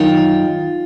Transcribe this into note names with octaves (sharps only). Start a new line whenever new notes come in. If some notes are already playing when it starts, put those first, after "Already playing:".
Already playing: F#2 D#3 F4